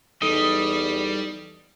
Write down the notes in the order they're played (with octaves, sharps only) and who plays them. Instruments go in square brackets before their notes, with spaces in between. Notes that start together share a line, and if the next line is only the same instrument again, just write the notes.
[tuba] E2 [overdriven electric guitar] G3 [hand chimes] D#4 A4 [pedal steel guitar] D#5